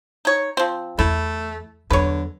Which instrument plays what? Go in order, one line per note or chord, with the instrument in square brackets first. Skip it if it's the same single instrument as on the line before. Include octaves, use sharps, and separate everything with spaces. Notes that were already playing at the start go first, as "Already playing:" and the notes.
[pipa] D#4 C#5
F3 C4
[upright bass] E2 [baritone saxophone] A3 [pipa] E4
[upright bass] E2 F#3 [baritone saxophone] D3 [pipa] B4 C#5